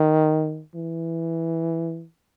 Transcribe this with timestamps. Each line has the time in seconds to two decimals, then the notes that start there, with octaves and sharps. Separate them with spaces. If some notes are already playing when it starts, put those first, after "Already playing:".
Already playing: D#3
0.75 E3